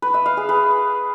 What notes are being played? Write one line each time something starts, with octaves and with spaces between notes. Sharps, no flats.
B4
E5
F5
G#4
B4